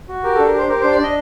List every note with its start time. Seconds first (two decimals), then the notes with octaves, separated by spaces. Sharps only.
0.08 F#4
0.23 G4 A#4
0.35 D4 A4
0.46 A#4
0.54 G4 C5
0.69 G4 A#4
0.81 D4 C5
0.91 D5
1.00 D4 D#5